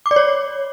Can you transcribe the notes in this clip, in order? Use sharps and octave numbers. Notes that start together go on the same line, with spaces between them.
D6
D5
C#5